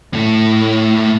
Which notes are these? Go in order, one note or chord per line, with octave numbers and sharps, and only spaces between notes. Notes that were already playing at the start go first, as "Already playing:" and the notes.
A2 A3